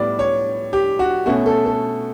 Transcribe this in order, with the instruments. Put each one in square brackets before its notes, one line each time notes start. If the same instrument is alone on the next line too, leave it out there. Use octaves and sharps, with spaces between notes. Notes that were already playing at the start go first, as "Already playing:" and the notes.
Already playing: [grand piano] A2 G3 B3 D5
C#5
G4
F#4
B2 A3 C#4 F#4
A4
A4